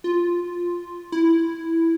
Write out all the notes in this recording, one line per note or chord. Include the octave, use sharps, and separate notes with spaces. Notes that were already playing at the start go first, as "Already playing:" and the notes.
F4
E4